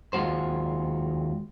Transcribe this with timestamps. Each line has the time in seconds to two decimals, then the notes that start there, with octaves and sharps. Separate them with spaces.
0.13 D#2 G#3 F4 F#4 C5